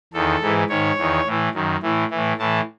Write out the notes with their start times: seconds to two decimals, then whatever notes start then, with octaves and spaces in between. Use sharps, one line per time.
0.13 E2 D#3 A4
0.41 G#2 E3
0.69 G#2 D#3 C#5
0.98 E2 D#3
1.26 A2 E3
1.54 F#2 D#3
1.83 A2 E3
2.10 A2 E3
2.38 A2 E3 A5